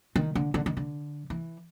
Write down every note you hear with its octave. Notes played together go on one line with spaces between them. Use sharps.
D#3
D3
D3
D#3
D3
E3